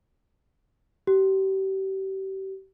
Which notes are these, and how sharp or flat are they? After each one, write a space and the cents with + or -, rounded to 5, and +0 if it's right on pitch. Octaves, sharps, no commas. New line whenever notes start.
G4 -35